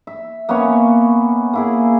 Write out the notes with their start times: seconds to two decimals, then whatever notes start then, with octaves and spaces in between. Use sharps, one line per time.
0.07 E5
0.49 A#3 B3 C#4 C#5
1.53 A#3 E4 G#4